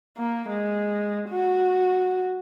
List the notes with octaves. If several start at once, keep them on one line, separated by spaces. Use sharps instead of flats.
A#3
G#3
F#4